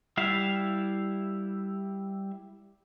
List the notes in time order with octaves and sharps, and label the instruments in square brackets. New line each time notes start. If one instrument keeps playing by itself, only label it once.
[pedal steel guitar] G3 E4 E5 F5